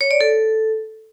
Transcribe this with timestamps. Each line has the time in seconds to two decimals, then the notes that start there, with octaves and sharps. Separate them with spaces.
0.01 C#5
0.11 D5
0.21 A4